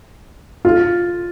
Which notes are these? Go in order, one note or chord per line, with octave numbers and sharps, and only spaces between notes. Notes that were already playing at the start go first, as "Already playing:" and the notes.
F4